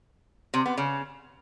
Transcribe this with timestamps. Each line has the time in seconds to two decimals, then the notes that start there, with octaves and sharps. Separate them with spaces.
0.54 C3
0.66 B3
0.78 C#3